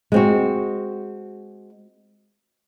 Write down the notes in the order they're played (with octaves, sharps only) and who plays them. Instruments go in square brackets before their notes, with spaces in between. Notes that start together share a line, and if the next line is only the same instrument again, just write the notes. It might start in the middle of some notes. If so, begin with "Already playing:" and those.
[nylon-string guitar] G#3 C4 F#4